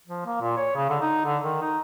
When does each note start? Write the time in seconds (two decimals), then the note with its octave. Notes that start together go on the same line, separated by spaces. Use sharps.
0.07 F3
0.26 A#3
0.42 A#2
0.57 C#5
0.76 C#3
0.90 D3
1.01 D#4
1.25 D3
1.44 D#3
1.62 D#4